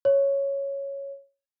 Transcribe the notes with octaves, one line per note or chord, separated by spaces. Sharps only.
C#5